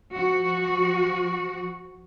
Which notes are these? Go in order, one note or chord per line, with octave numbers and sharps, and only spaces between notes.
F3 F#4